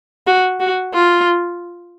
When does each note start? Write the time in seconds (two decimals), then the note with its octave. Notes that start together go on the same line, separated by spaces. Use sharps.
0.27 F#4
0.60 F#4
0.94 F4